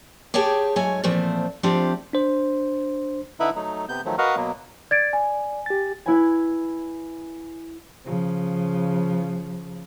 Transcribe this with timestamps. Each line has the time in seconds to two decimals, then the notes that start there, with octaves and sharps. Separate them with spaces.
0.34 G4 G#4 C#5 G5 A5
0.76 G#2 F#3 A3 C#5 G#5
1.04 A#2 E3 F3 A3 C4
1.63 F3 A3 C4 D4 F4 G4
2.13 D4 C5
3.40 D3 D#4 E4 B4 E5 B5
3.56 F#3 A3 D#4
3.89 C3 B3 G6
4.05 D#3 F3 F#3 A3
4.18 F#4 A#4 B4 D#5 F5 F#5
4.36 B2 F#3 A#3 B3
4.91 D5 G#6 A6 D7
5.13 G#5
5.66 G4 A6
6.06 E4 B4 G#5
8.05 C#3 F3